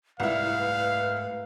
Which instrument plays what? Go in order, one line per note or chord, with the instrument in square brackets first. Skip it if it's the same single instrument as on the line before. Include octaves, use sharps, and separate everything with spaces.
[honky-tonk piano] C2 E4 [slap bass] G#2 A3 [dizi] B4 [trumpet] F5